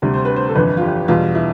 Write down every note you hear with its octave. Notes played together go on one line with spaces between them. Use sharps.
D2 C3 G3
C5
B4
C5
A4
G1 F2 E3 B4
F4
G4
E2 B2 G3 F4
E4